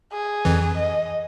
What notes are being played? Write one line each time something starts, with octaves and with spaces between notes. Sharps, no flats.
G#4
F2 E3
D#5